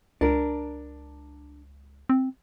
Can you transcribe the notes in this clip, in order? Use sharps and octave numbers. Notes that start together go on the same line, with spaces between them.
C#2 D4 A#4
C4